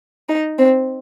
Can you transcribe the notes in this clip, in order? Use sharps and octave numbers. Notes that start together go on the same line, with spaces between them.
D#4
C4